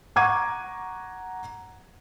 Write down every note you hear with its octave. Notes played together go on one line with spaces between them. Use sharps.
F#5 A#5 C#6 D6 G#6 D#7